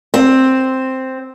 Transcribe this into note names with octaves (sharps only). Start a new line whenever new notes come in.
C4